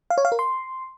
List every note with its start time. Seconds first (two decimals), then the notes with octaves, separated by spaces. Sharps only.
0.10 F5
0.18 C#5
0.25 F5
0.32 A#4
0.39 C6